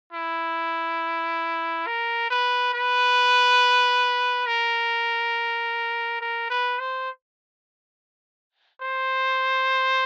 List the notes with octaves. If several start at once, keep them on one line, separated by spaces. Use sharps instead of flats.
E4
A#4
B4
B4
A#4
A#4
B4
C5
C5